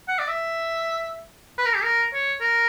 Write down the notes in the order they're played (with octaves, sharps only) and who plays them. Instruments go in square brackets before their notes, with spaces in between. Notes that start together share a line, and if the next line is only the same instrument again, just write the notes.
[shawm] F#5
D5
E5
B4
A#4
G4
A#4
C#5
A#4